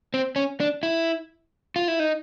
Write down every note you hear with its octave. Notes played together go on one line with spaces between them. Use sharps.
C4
C#4
D4
E4
F4
E4
D#4